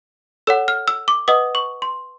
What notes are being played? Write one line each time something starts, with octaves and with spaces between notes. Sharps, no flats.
A4 C#5 F#5 E6
F6
E6
D6
B4 D#5 F#5 D#6
C#6
C6